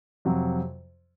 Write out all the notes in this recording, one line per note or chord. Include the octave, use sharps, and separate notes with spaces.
F2 C3 F#3